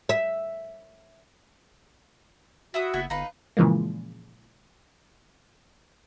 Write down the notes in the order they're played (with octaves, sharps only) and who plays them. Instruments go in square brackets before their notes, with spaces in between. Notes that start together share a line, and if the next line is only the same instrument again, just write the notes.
[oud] E5
[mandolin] E4 E5 D#6 [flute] F#4
[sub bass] F#1 [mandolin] B3 E4 E5
[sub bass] G1 [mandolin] D#4 B4 [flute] F5
[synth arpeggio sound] A#2 C#3 E3 F3 G#3 A#3